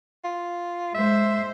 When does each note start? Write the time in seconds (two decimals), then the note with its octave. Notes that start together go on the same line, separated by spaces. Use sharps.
0.24 F4
0.94 G#3 C5 E5